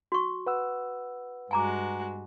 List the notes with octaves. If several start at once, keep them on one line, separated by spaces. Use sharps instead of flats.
F#4 C#6
B4 F#5 E6
G2 G#3 F#4 G#5 A#5 D6